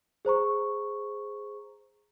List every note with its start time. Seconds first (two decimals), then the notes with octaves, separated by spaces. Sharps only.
0.25 G#4 C5 A#5 C#6